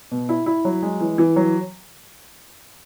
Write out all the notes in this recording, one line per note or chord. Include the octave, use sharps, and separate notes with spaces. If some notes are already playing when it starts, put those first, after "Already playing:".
B2
E4
E4
F#3
G#3
E3
E3
F#3